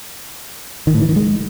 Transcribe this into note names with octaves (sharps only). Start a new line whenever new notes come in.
D#3
A2
E3
D#3
G#3